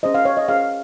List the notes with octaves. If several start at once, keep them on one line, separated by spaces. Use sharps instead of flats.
C#4 G#4 C5 D#5
F5
C#5
D#5
C#4 G#4 C5 F5